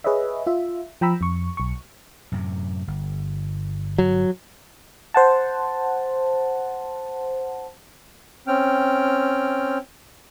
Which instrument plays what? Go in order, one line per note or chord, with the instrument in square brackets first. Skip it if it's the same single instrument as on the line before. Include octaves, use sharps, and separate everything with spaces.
[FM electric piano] G#4 B4 C#5 D#5 E5
F4 E5
F3 G5 A#5 B5 E6
F2 C#6
B1 C#6
[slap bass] F#2 A2 C3
G1
[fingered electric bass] F#3
[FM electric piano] C5 F#5 A5
[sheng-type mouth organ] C4 C#4 G5 F6